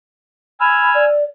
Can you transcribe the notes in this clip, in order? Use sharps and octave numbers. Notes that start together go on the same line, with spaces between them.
G#5 B5 E6 F6
D5